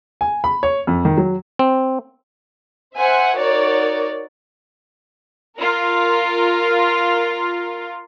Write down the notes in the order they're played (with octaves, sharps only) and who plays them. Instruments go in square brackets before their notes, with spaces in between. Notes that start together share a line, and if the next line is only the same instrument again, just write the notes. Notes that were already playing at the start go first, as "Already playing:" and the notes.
[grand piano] G#5
B5
C#5
F2
D#3
F#3
[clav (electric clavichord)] C4
[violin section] C5 E5 F#5 G#5
D#4 F#4 A#4 C#5 D5
[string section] F4 A#4